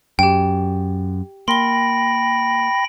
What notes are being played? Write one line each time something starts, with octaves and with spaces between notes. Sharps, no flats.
F#2 G4 G5
A#3 G5 B5 C6 A#6 G7